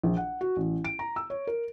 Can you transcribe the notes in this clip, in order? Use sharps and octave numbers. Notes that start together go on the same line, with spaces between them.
A#1
F#5
F#4
A1
D7
A#5
E6
C#5
A#4